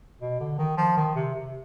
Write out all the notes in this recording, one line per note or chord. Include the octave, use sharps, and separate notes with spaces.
B2
D3
D#3
F3
D#3
C3
C3